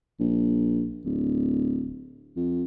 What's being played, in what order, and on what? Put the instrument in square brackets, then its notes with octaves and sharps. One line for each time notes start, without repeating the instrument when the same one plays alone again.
[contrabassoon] A#1
D1
F2